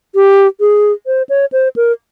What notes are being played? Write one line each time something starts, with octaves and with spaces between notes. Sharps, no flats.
G4
G#4
C5
C#5
C5
A#4